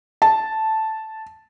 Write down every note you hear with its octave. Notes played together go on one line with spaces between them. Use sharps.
A5